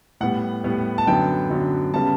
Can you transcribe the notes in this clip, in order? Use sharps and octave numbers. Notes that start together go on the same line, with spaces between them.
A2 G3 B3 F#5
A2 G3 B3
A5
F#2 D3 F#3 B3 G5
F#2 D3 F#3 B3
C#3 G3 B3 A5